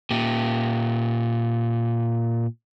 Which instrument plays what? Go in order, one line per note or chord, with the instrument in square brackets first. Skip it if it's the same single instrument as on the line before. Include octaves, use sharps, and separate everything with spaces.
[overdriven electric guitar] A#2 G4